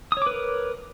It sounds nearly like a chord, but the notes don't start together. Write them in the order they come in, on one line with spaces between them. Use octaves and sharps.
D#6 C#5 D6 B4 A#4